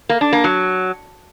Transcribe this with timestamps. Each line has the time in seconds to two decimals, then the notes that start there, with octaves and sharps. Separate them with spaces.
0.09 A#3
0.21 D4
0.32 A#3
0.44 F#3